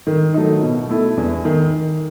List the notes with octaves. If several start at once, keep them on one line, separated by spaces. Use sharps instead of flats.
D#3
F#3 A3 D#4
B2
A3 E4
E2
D#3